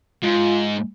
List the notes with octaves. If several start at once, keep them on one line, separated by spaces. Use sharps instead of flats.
G#2 F4